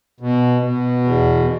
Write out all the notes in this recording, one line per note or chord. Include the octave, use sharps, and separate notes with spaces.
B2
B2
E2